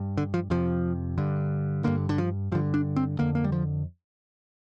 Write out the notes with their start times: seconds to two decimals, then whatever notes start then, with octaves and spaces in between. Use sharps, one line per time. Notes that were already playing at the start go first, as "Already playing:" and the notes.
Already playing: G2
0.17 D3
0.34 F3
0.50 F2 C3 F3
1.18 G2 D3
1.84 G2 D3 A#3
2.09 D3
2.18 F3
2.52 G2 F3
2.55 D3
2.74 D4
2.96 C4
3.19 F2 D3 A#3
3.35 A#3
3.44 G3
3.52 F3